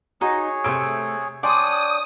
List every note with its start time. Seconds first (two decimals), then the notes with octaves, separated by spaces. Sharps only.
0.21 D#4 F#4 G#4 C#5
0.64 C3 A3 A#3 E6 G#6 D7
1.43 D4 C#5 D5 G5 G#5 C6 D#6